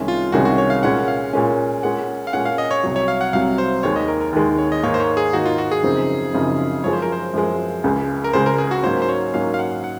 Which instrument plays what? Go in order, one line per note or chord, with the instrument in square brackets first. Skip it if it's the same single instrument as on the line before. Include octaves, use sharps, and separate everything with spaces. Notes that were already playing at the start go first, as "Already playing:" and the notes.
Already playing: [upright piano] C2 C3 D#3 G#3 C#4
[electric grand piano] F4
[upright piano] C2 C3 D#3 G#3 C#4 [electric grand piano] F#4
[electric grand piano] F#4
C#5
F5
[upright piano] A#2 G#3 C#4 [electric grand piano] F#5
[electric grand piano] F5
[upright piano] A#2 G#3 C#4
[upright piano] A#2 G#3 C#4 [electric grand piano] F#5
[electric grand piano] F5
[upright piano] A#2 G#3 C#4 [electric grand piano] F#5
[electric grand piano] F5
D#5
C#5
[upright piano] C2 C3 F#3
[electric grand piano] C#5
F5
F#5
[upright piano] C2 C3 F#3 [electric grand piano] F5
[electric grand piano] C5
[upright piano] D#2 D#3 G#3 [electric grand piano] C#5
[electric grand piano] D#5
A#4
A#4
[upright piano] D#2 D#3 G#3
[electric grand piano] C#5
D#5
[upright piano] G#2 D#3 A#3 D#4 [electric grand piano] C#5
[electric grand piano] C5
C#5
G#4
[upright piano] G#2 D#3 A#3 D#4 [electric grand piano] F#4
[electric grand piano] F4
F#4
G#4
[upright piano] F#2 C#3 F3 C4 D#4
F#2 C#3 F3 C4 D#4
[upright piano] F#2 F3 G#3 [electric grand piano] C#5
[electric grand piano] C5
A#4
C5
[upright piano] F#2 F3 G#3
C#2 C#3 G#3
[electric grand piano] A#4
[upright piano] C#2 C#3 G#3 [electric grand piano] C5
[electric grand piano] A#4
G#4
F#4
[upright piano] G#2 F#3 A#3 C#4 [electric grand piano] C5
[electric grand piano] C5
C#5
[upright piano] G#2 F#3 A#3 C#4 [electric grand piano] F5
[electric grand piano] F5
F#5
F#5